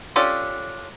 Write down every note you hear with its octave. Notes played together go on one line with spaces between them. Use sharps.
C#4 D4 F4 G4 A4